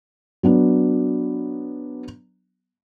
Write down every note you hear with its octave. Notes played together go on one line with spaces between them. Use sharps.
F#3 B3 D4